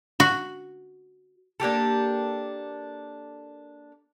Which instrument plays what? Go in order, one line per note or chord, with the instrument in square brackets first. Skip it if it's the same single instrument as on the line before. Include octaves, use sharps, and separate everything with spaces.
[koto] F#4
[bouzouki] A#3 D4 G4 A4